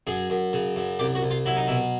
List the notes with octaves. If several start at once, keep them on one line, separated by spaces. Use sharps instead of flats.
F#2 G#4
F#2
C#3
F#2
C2 G4
F#4
C2
F4
F#3 E4
D#4
B2 E4